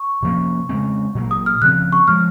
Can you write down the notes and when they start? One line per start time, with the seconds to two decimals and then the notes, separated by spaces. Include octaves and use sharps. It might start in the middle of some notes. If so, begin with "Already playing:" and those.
Already playing: C#6
0.22 C3 F3 A#3 C#4
0.69 C#3 G#3 C4
1.15 A#2 F#3 A#3
1.31 D#6
1.46 F6
1.62 C#3 F3 C4 F#6
1.92 C#6
2.08 F3 G#3 F6